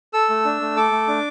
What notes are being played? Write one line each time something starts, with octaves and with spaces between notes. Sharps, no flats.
A4 E6
A3
D4
A3
A4 D6
A3
D4